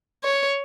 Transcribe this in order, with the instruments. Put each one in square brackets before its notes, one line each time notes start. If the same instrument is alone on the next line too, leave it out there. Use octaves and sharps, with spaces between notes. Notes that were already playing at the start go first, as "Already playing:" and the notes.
[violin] C#5